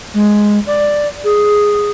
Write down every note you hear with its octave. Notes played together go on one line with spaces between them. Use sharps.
G#3
D5
G#4